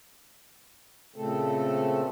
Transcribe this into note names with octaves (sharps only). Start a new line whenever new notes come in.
A#2 C#3 A3 C4 A4